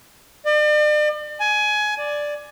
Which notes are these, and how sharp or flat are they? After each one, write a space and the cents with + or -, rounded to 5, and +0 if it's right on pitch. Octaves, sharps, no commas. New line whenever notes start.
D5 +40
G#5 +20
D5 +0